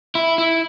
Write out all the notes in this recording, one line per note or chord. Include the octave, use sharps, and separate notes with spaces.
E4
E4